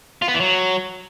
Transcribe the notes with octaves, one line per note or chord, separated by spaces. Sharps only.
F4
B3
E3
F#3